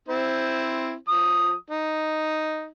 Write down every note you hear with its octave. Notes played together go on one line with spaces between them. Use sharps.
C4 E4 C5
F3 D#6
D#4